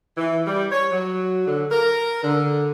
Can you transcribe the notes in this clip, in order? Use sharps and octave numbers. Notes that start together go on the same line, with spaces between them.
E3
G3
C#5
F#3
D3
A#4
D3